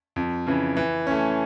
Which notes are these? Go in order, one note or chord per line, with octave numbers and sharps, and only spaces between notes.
F2
C#3 E3
E3
A3 C#4